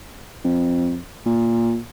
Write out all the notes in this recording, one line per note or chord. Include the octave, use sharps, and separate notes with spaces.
F2
A#2